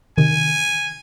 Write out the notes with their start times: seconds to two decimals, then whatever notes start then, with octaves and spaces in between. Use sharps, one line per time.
0.18 C3 D#3 G#5